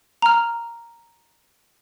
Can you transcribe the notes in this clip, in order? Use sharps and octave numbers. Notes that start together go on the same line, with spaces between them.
A#5 F6